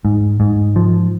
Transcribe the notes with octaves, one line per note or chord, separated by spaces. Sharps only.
G#2
G#2
F3